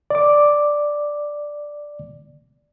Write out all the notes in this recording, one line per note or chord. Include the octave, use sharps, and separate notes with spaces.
D5 D6